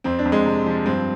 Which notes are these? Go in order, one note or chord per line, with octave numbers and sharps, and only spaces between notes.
F2 C4
D4
F2
G#3
C3
F3
G2 C4